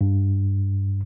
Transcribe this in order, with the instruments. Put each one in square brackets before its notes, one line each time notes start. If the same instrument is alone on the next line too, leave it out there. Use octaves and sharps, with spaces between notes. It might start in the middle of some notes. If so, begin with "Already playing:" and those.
[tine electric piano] G2